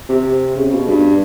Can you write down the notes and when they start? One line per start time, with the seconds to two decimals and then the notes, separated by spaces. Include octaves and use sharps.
0.09 C3
0.56 C#3
0.72 B2
0.88 G2